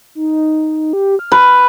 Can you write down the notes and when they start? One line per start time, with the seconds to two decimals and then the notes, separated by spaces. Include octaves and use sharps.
0.15 D#4
0.93 G4
1.19 F6
1.32 B4